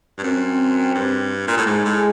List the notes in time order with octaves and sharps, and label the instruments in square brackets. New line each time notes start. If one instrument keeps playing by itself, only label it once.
[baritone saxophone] G2
[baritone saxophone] F#2 [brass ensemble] C4
[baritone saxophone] G2
A#2
A2
[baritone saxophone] G#2 [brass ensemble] G#3
[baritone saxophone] A2